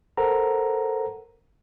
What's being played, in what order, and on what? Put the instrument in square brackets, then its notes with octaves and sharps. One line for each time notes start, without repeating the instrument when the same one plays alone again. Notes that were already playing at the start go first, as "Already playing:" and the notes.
[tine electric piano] A4 A#4 C5 F#5 A#5